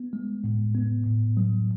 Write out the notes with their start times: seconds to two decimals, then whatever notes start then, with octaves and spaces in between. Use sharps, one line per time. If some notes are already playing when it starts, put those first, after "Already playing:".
Already playing: B3
0.13 G#3
0.44 A2
0.75 B3
1.06 A2
1.37 F#3